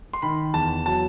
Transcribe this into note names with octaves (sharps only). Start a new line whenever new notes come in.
C6
D#3 B5
E2 A5
F#3 A5